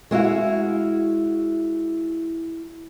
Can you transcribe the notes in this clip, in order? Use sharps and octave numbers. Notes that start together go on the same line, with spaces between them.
G#3 E4 F#4 F5